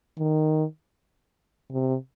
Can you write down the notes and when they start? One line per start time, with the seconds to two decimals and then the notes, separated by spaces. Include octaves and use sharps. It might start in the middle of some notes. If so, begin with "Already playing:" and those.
0.18 D#3
1.72 C3